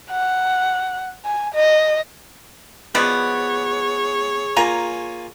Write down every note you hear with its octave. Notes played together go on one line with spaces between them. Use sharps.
F#5
G#5
D#5
B2 F3 B3 G#4 C#5 D5
A#3 F4 G#5 A#5